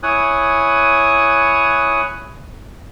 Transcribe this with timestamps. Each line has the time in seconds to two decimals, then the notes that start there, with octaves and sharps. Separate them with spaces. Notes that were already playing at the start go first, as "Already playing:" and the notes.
0.03 E4 C#5 G#5 D#6 F#6